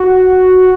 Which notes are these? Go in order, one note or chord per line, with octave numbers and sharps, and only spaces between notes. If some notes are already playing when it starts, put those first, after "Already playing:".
Already playing: F#4